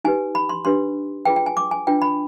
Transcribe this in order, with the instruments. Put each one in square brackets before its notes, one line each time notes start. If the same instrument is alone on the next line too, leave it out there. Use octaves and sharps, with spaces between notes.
[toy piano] D#4 G4 B4 G#5
B5
C6
D4 G4 B4 C6
F4 G#4 B4 G5
G5
G#5
D6
G#5
D4 F4 B4 G5
B5